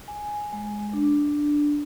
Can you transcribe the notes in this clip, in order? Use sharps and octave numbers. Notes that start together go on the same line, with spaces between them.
G#5
G#3
D4